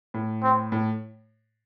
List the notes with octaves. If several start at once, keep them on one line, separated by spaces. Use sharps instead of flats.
A2
C4
A2